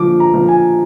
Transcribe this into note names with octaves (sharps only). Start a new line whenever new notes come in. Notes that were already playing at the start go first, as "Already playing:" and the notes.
Already playing: D3 F3 D6
A#5
F3
G#5